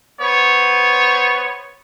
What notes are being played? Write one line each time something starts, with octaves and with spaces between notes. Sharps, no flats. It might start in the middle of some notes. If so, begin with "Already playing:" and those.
B3 C5 C#5